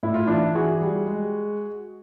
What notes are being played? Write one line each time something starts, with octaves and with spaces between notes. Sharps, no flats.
A2 E4
F4
E3 D4 E4
E3 F#4 G#4
G3
G#3